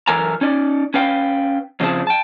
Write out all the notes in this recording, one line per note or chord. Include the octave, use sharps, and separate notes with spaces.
F#2 E3 A4 A#4 G#5 A#5
C#4 D#4 D5
C#4 B4 F5 G5
F2 C#3 F3 C4 G#4 A5
G5 A5